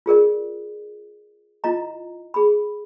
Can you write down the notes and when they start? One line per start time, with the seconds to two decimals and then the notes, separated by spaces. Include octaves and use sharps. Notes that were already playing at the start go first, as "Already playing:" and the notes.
0.06 F4 G#4 A#4 D5
1.64 E4 F4 D#5 A#5
2.34 G#4 B5